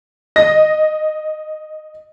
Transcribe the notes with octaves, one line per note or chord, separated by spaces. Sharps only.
D#5 A#6